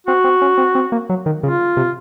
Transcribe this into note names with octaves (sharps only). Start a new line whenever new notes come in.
C4 F#4
C4
C#4
C4
C4
A#3
F#3
D#3
C#3 F4
C3